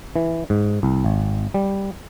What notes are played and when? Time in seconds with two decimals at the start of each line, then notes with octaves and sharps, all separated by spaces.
0.16 E3
0.50 G#2
0.83 C2
1.04 G#1
1.54 G3